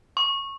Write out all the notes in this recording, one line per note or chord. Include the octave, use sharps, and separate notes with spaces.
C#6